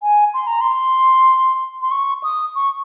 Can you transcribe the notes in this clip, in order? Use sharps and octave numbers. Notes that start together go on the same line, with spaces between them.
G#5
C6
A#5
C6
C6
C#6
D#6
C#6